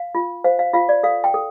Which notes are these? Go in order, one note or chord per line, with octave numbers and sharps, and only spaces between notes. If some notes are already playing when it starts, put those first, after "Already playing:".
Already playing: F5
F4
C5 F5
F5
F4 F5
D5
A4 F5
G5
A4